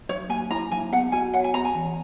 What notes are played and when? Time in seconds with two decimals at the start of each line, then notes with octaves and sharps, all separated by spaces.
0.09 F#3 C#5
0.30 A#3 G#5
0.51 E4 A#5
0.71 F#3 G#5
0.93 B3 F#5
1.12 F#4 G#5
1.34 C#5 F#5
1.44 G#5
1.54 B3 A#5
1.65 G#5
1.75 E3